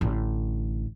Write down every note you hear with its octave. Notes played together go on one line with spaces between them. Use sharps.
A1 D3